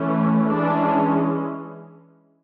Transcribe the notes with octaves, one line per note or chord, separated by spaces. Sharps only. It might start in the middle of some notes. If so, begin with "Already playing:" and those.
Already playing: E3 A3 C#4
E3 G#3 C#4 D4